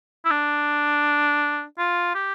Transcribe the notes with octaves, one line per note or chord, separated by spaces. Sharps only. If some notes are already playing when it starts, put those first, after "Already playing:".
E4
D4
F4
G4